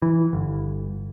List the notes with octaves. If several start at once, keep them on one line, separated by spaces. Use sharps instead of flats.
E3
G1